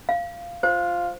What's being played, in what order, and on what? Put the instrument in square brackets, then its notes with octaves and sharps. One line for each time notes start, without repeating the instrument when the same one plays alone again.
[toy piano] F5
[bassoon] F4 [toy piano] C5